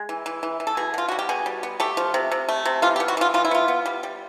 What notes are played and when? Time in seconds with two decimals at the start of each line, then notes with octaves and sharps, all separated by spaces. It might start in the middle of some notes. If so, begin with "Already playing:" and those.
Already playing: G#3
0.09 E3
0.26 E3
0.43 E3
0.60 E3
0.67 A4
0.77 B2 G#4
0.94 B2 F4
1.08 G3 F#4
1.19 G4
1.29 B2 G#4
1.46 G3
1.63 B3
1.80 A3 G4
1.97 F3
2.14 C3
2.31 C3
2.49 A3
2.65 C3
2.82 E3 F4
2.96 G4
3.00 B3
3.08 F#4
3.17 E3 F4
3.34 E3 F4
3.45 E4
3.51 B3 F4
3.68 B3
3.86 G3
4.03 G3